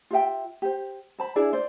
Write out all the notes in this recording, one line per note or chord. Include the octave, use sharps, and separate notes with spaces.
F4 G4 E5 G5
G4 C5
C5 A5 B5
D4 E4 G#4 D5
C5 D5